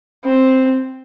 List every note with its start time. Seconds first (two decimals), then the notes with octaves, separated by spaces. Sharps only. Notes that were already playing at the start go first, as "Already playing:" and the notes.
0.24 C4